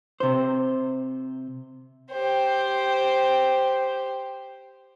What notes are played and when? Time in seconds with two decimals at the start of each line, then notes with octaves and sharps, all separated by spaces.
0.20 C3 C5
2.12 G4 C5